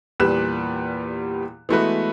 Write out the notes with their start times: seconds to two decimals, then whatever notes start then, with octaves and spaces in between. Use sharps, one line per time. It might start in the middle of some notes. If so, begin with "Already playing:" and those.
0.20 E2 A#2 G3 B4 F#6 E7
1.69 E3 G#3 A3 B3 F#4 B4